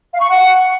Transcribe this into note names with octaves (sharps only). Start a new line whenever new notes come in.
F5
C#6
F#5